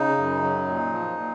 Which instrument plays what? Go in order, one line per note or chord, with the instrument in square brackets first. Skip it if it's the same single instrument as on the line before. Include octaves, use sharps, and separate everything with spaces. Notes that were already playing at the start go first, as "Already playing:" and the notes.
Already playing: [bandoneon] C#3 D#4
F#2
F#3
A#2
F3
A#2